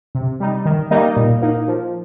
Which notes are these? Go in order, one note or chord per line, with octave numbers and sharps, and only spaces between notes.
C3
G3 D#4
D#3
G3 A#3 D#4
A#2
A#3 D#4
F3